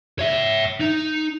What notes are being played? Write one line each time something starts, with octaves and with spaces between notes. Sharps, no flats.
C#5 E5
D#4